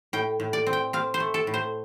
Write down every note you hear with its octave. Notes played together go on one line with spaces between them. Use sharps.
A2 G5
A2
D5
C4
G5
C4 F5
C5
A3
A4
A2
C5